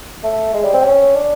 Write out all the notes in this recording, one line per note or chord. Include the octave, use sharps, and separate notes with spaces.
A3
G#3
G3
C4
C#4
D4